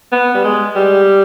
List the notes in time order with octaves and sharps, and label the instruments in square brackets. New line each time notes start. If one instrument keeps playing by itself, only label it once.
[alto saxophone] B3
G3
G#3
G3